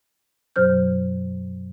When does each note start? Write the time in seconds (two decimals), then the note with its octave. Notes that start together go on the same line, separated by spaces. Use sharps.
0.56 F#2 B2 F#3 C5 F6 G6